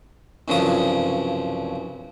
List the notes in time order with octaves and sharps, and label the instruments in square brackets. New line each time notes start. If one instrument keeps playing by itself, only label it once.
[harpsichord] C2 G2 C#3 F3 F#3 D#6